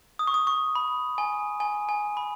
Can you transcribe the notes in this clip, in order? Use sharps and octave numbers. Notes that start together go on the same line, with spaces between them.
D#6
C#6
D#6
C#6
B5
G#5
G#5
G#5
B5